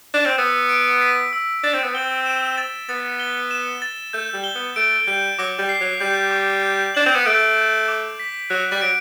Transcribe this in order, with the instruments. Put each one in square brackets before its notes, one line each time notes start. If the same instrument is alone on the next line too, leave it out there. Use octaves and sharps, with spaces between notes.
[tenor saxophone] D4
C4
[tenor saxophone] B3 [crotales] E6
[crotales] D7
B6
E6
[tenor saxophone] D4 [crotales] A6
[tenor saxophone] C4
B3
[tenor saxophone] C4 [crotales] G7
[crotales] E7
A6
[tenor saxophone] B3 [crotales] A6
[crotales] G7
E7
A6
[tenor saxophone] A3 [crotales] G6
[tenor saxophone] G3
[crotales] G7
[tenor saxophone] B3
[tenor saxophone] A3 [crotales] D7
[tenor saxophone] G3 [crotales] G6
[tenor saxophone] F#3 [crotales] D6
[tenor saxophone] G3
[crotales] C7
[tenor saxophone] F#3
[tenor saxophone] G3 [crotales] G6
[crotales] D6
G6
[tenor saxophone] D4 [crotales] F#7
[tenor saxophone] C4
B3
[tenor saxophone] A3 [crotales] D7
[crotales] G6
D6
B6
[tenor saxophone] F#3 [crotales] F#6
[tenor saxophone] G3
[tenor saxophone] F#3 [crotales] D7